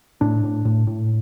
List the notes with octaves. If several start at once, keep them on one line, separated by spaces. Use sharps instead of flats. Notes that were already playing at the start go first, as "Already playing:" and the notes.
A2 D4
A2
A2
A2